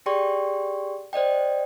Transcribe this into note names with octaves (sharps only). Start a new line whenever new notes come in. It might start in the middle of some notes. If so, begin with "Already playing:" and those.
G4 G#4 D5 G5 C6 C#6
C5 D5 D#5 G5